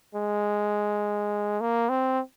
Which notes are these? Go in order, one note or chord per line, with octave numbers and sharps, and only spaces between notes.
G#3
A#3
C4